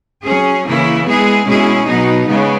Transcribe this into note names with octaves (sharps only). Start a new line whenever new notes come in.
F#3 C#4 G#4
C#3 E3 A#3 E4
G#3 B3 E4 G#4
B2 G#3 C#4 E4 G#4
B2 F#3 B3 D#4
C#3 G#3 B3